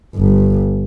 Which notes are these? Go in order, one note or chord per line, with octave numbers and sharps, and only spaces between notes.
G1 G2